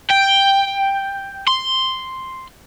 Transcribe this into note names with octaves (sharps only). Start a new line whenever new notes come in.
G5
C6